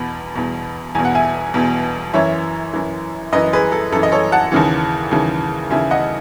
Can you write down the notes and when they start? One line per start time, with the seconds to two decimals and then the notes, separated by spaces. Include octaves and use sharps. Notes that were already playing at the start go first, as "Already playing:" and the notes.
Already playing: E2 B2 B5
0.35 E2 B2
0.95 E2 B2 G#5
1.05 F#5
1.15 E5 G#5
1.54 E2 B2
2.14 F#2 E3 C#5 E5
2.74 F#2 E3
3.32 F#2 E3 B4 D#5
3.53 G#4 B4
3.72 A4
3.92 F#2 A4
3.96 E3
4.03 D#5
4.12 A4 C#5
4.32 F#5 A5
4.52 D#2 C#3 E3
5.11 D#2 C#3 E3
5.70 D#2 C#3 E3 E5 G#5
5.91 D#5 F#5